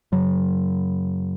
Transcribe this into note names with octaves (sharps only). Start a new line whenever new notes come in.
F#2 C#3 F#3